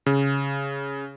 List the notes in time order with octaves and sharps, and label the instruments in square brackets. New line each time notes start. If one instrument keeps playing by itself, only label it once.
[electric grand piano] C#3